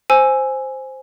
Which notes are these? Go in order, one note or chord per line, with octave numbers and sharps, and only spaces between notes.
C5 G#5 E6